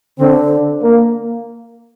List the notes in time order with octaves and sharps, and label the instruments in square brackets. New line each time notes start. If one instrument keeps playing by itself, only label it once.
[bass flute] D3 [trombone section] C4
[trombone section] A#3